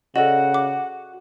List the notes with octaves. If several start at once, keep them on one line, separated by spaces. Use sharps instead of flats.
C#3 F#4 A4 D5 D#5 F#5
D6